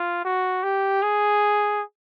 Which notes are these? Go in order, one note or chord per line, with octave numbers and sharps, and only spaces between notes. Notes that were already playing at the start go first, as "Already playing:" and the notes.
Already playing: F4
F#4
G4
G#4